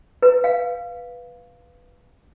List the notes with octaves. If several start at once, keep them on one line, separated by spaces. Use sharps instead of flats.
B4
F5